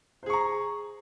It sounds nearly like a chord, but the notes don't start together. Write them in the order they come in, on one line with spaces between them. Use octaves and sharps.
C5 G#4 C#6 A#5